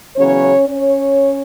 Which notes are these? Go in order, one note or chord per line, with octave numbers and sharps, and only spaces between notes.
E2 C#3 F#3 C#4 C#5
C#4 C#5